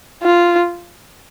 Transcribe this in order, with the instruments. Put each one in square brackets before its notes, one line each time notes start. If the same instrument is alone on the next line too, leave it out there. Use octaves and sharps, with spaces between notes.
[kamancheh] F4